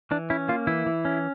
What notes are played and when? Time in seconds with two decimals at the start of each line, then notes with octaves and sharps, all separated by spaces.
0.11 E3 D4
0.30 C#4 E4
0.48 A#3 F4
0.67 E3 E4
0.86 E3
1.05 C#4